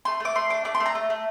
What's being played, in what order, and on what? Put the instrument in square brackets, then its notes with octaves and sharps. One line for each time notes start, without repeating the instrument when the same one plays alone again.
[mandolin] A3 C6
A3 D6
A3 C6
D4 D6
A3 D6
C6
A3
A#5
A3
A3